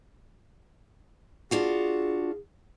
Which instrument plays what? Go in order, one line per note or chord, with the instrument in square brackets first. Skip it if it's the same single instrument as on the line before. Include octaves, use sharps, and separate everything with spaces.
[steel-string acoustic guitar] D4 F4 F#4 [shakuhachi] G#4